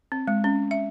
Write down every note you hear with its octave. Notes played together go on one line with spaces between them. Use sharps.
C4
G#3
C#4
E5